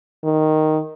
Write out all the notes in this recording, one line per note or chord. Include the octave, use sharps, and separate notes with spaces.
D#3